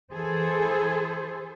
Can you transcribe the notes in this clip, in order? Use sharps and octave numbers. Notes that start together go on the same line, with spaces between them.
E3 G#4 A4 C5